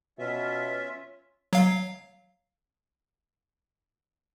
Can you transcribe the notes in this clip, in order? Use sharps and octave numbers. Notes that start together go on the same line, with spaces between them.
B2 C#4 F4 E5
F#3 F5